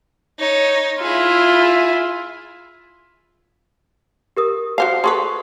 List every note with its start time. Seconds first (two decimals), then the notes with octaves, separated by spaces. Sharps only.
0.39 D#4 C#5
1.02 E4 F4 G#4 E5
4.37 G4 A#4 D#6
4.78 F#4 C5 F5 C7
5.04 G#4 A4 B4 C6 C#6